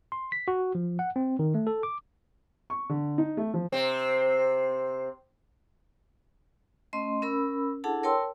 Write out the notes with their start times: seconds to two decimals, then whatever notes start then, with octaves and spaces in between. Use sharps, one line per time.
0.12 C6
0.32 B6
0.48 F#4
0.75 F3
0.99 F#5
1.16 C4
1.39 D#3
1.55 A3
1.67 A4
1.83 D6
2.70 C#6
2.89 D3
3.18 D#4
3.37 A3
3.54 F3
3.72 C3 C4
6.93 A3 C#4 D#5 C6
7.22 C#4 A#4 B5 E6
7.84 D4 E4 G#4 A4 F#5 A5
8.03 A#4 C#5 G5 A5 C6 E6